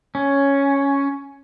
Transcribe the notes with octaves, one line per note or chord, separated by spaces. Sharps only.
C#4